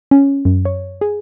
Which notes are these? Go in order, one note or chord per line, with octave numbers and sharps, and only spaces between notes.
C#4
F#2
C#5
G#4